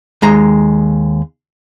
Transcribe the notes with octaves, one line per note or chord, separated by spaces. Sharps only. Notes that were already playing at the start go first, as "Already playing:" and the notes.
D#2 G#3 A#5